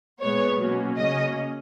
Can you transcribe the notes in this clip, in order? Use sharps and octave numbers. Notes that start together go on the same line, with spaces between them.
A#2 G#3 B3 C#5
B2 F#3 A#3 C#4
C#3 F#3 A#3 C#4 D#5